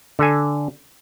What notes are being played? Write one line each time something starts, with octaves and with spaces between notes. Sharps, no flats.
D3 A4 G#5